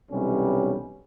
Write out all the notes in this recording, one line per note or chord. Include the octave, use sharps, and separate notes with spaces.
B1 C3 E3 G3 C#4